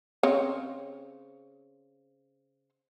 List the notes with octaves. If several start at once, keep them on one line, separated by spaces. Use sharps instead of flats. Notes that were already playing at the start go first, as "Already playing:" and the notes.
C#3 C4 C#5